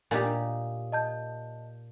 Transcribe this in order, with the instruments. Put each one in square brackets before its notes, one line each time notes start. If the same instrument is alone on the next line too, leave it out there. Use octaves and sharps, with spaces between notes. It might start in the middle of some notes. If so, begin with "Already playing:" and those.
[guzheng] A#2 D#4 G4 [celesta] G#5
[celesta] D#5 A5 G6